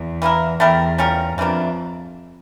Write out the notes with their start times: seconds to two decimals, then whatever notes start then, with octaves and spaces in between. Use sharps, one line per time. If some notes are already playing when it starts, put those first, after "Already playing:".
Already playing: E2
0.22 E3 A#3 E4 A#4
0.60 E2 A3 E4 G4 A#4
0.98 G3 C#4 F4 A#4
1.37 F2 C#3 E3 A#3 D4